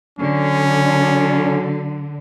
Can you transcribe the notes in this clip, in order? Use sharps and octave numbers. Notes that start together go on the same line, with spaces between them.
D3 F#3 C#4